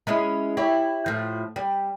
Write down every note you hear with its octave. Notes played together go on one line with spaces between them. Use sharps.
G#3 C#4 E4
E4 G4 C#5
A2 F3
G3